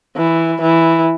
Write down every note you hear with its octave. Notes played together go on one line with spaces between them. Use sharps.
E3
E3